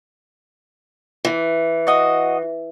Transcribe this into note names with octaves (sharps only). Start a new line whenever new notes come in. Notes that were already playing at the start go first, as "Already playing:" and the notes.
E3
F#4 D#5